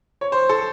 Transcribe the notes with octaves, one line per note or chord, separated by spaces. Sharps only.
C#5
C5
A4